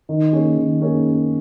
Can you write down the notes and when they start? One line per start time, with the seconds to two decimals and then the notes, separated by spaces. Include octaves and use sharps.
0.09 D#3
0.33 A#3 C#4 G#4 C#5
0.57 D#3
0.81 A#3 C#4 G#4 C#5